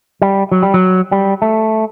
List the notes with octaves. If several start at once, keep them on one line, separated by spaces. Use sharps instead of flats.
G3
F#3
G3
F#3
G3
A3